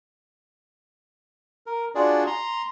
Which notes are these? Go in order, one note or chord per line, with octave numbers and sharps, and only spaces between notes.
A#4
D4 F4 F#4 G#4 D5
A#5 C6